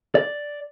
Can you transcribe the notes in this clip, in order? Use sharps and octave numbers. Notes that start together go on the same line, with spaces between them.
D5